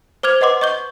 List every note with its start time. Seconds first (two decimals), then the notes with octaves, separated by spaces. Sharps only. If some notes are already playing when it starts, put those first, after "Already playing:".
0.23 C5 D6 F6 G#6 F7
0.41 B4 D#5 F#5 C6 D6
0.61 D#5 C#6 G6 G7